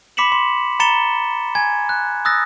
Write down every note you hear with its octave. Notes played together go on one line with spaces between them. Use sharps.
B5 D6 B6 C#7 E7 F#7
C6
A#5 B5 A6 C#7 E7 G7
G#5 G#6
F#6
D#6 E6 F#6 A6 A#6